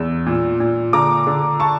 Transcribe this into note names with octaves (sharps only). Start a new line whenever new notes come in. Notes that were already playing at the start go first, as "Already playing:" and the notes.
Already playing: E2 E6
A#2
A#2
D3 A#5 D6
D3
A5 C#6